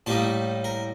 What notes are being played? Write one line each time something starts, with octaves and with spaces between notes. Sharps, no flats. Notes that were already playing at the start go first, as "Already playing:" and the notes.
A2 G3 A#3 D#4 A5
A#4